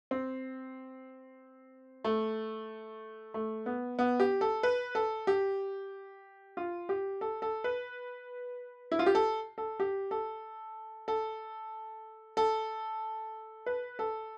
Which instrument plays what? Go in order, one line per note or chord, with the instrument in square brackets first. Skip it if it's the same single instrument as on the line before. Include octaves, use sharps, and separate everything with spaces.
[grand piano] C4
A3
A3
B3
B3
G4
A4
B4
A4
G4
F4
G4
A4
A4
B4
E4
F4
G4
A4
A4
G4
A4
A4
A4
B4
A4